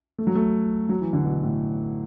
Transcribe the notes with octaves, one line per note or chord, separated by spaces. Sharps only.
A3
F#3
A3
F#3
E3
D3
B2
A2